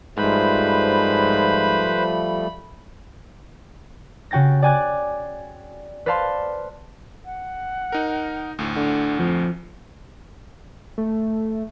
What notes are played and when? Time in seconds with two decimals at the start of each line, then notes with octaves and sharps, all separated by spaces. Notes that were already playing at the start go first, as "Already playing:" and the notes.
0.17 G#2 F3 G3 A3 B4 C5 B5
4.31 C#3 F#4 G5 A6 A#6
4.62 D5 G5 G#5 D6 F#6 A6
6.06 B4 C5 D5 F5 A5 C6
7.25 F#5
7.92 D#4 A#4
8.59 D2 A2
8.76 D3 F#5
9.19 F2 F3
10.98 A3